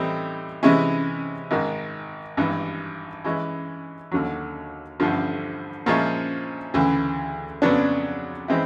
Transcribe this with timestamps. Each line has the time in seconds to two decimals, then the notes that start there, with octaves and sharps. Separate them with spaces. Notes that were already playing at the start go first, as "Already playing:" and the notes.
Already playing: A2 E3 G3 C4 D#4
0.63 C3 E3 G#3 C#4 E4
1.51 G#1 G#2 D#3
2.37 G#1 G2 E3
3.25 E3 G#3 C#4 E4
4.12 D#2 D3 F#3
5.00 A1 G2 D3 F3 A3
5.86 A#2 F3 G#3 C#4 E4
6.74 D2 C#3 E3
7.62 F2 C#3 F#3 B3 D4
8.48 E3 G#3 C4 E4